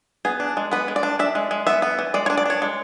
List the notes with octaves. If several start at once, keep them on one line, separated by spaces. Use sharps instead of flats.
B3 G#4
D4
G#3
B3 B4
G#3
D5
D4
D4 E5
G#3
G#3
B3 E5
B3
E3
G#3 D5
C#5
D4
D5
D4 C#5
G#3